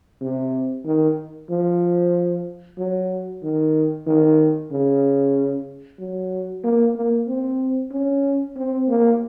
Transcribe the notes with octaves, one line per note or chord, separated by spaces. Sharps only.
C3
D#3
F3
F#3
D#3
D#3
C#3
F#3
A#3
A#3
C4
C#4
C4
A#3